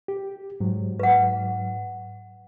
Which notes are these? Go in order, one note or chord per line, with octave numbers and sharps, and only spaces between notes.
G4
G#2 F#3
B4 F#5